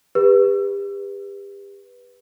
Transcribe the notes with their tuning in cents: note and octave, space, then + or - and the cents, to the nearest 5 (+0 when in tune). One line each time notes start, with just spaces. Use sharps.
G4 +35 B4 -10